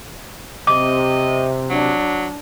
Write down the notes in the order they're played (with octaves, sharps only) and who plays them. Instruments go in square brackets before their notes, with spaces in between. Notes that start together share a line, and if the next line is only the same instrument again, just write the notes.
[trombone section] C3 [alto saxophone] D#5 [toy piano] D6
[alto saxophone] F#3 [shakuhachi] D4